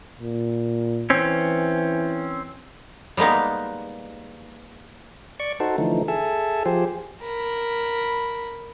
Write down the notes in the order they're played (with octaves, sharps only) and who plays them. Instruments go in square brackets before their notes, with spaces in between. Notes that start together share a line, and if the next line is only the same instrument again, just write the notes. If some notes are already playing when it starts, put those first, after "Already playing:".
[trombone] A#2
[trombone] E3 [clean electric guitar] C4 C#4
[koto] G3 G#3 A#3 B3 D#4
[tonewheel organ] D5 C#6
D#4 F#4 A4 C5
D3 E3 F3 A3 D#4
G#4 A4 E5
F3 G4 G#4 C5
[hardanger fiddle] A#4 B5